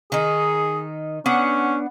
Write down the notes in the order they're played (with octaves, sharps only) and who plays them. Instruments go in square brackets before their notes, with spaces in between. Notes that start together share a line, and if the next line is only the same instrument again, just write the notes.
[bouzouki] D#3 D#4 [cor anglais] G#4
[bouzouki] B3 D4 F#5 [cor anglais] C#4